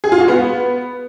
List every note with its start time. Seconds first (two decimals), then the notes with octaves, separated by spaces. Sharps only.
0.04 G#4
0.12 F4
0.20 F#4
0.28 B3